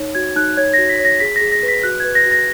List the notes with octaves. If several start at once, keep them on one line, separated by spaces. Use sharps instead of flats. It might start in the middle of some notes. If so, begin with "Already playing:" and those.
Already playing: D#4 C#5
F#4 G#6
D#4 F#6
C#5 G#6
F#4 A#6
B6
C#5
A#6
G#4 B6
G#4 A#6
A#6
B4
B6
F#4 F#6
B4 G#6
A#6
F#4
A#6